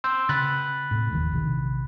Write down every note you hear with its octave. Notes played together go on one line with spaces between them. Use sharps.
C6 E6 G6
C#3 B5 F#6 A6
A2 C3
F1 D#2 E3
A#1 C3 D#3